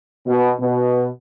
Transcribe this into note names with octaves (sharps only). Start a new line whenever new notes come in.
B2 B3
B2 B3